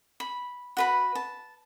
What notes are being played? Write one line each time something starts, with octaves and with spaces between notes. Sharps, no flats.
B5
F#4 B4 B5
A5